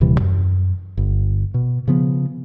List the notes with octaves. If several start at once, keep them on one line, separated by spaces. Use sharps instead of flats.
D#1 C3 E3 G3
F#2
G1
B2
C#3 F3 B3